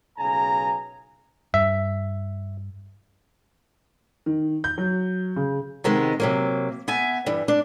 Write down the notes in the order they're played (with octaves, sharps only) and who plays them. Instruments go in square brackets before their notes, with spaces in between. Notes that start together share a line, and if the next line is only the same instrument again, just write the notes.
[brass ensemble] B1 C#3 G#5 A#5
[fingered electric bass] G2 [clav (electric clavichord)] E5
[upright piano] D#3
G6
F#3
C#3
[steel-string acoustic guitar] C3 D#3 G#3 B3
C3 F#3 A#3
B3 E5 G#5
G2 E3
D4